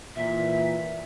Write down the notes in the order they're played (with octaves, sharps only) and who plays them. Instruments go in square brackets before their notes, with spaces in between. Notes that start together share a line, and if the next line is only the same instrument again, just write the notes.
[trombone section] A#2 E3 [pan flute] E5